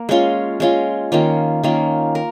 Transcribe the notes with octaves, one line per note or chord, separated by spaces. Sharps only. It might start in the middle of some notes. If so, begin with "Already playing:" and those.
Already playing: A#3 A#4
G#3 C#4 F4
G#3 C#4 F4
D#3 A#3 C#4 F4
D#3 A#3 C#4 F4
A#4